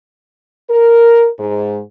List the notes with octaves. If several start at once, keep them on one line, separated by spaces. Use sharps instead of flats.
A#4
G#2